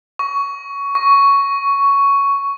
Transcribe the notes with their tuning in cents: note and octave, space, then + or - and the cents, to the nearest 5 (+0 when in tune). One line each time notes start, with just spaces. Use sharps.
C#6 +15
C#6 +5